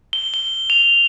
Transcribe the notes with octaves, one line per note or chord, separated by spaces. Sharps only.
G7
G7
F7